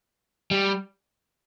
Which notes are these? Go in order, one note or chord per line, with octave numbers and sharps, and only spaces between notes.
G3